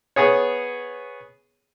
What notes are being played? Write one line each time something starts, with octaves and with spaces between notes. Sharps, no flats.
B3 G#4 C#5